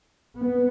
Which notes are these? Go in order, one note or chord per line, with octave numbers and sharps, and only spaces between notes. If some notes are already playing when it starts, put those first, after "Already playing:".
B3